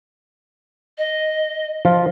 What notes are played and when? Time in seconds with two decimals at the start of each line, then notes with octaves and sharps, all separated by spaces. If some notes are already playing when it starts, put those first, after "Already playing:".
0.98 D#5
1.85 F3 F4